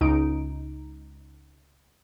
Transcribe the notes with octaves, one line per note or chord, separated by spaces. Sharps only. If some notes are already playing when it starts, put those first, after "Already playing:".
C#2 D#4 D7